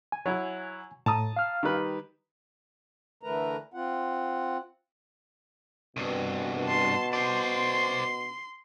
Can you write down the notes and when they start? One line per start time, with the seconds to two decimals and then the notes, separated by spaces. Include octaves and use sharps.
0.12 G#5
0.26 F#3 E4
1.06 A2 A5 A#5 D#6
1.36 F5 F6
1.63 D#3 G3 B4
3.23 D3 E3 A3 A#4 B4 A#5
3.74 C4 F4 F#5
5.97 C2 G2 B2
6.65 A5 C6
7.13 C5 D5 C6